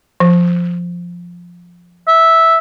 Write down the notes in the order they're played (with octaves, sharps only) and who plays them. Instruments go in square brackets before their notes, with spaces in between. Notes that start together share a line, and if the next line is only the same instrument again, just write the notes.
[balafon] F3
[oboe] E5